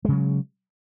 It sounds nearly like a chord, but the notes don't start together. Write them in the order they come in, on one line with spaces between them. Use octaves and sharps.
G#3 C#3 F#3